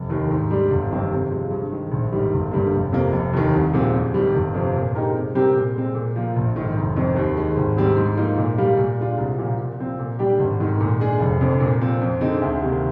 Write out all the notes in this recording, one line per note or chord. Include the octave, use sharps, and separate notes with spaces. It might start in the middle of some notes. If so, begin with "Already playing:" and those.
Already playing: F1
D#2 D#3
G#2
G3 D4
G1
F2 D#3 G3 C4
C3
F3 G#3
G2
D#3 G#3
A#1
G#2 D#3 G3
G1
G2 D3 G3 A#3
F1
F2 C3 F3 A#3
F1
D#2 D#3
C2
A#2 F3 G#3 C4
F2
D#3 G3
G1
F2 C3 F3
A#2
G#3 D#4 G4 A#4
C3
G3 C4 G4 A#4
A#2
G#3 C4
A#2
F3 A#3
A#1
G#2 D#3
F1
F2 D#3
D#2
D#3 G#3
G#1
G#2 G3 C4
G#2
F3 A#3 D#4
A#2
G3 A#3 F4
A#2
G#3 D4 F4
C2
A#2 F3 A#3
A#2
F3 C4
A#2
G3 D4 G4
G#1
G#2 D#3
A#2
G#3 D4 G#4
F1
F2 D3
A#2
F3 C4
F2
D3 G#3 C4 D#4
D2
C3 D#3 A#3